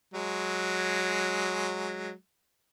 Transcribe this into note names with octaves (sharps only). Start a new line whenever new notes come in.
F#3 G#3